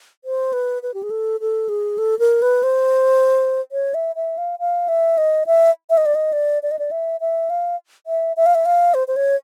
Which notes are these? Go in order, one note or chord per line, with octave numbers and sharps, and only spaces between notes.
C5
B4
B4
G4
G#4
A4
A4
G#4
A4
A#4
B4
C5
C#5
E5
E5
F5
F5
E5
D#5
E5
E5
D#5
D5
D#5
D5
D5
D#5
D5
E5
E5
F5
E5
E5
F5
E5
F5
C5
C5
C#5